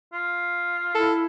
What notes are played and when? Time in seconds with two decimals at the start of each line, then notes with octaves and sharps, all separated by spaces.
0.13 F4
0.95 E4 A4